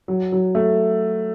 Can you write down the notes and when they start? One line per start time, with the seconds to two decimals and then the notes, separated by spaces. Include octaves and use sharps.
0.08 F#3
0.32 F#3
0.55 A3